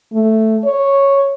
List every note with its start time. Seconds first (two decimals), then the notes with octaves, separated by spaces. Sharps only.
0.13 A3
0.64 C#5